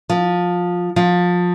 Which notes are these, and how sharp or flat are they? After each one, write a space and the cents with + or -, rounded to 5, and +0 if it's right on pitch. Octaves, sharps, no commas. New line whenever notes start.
F3 +20
F3 +25